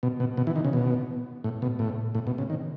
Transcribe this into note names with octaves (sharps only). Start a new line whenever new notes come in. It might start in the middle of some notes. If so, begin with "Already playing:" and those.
B2
B2
B2
E3
D#3
C#3
B2
A2
B2
A2
A2
B2
C#3
D#3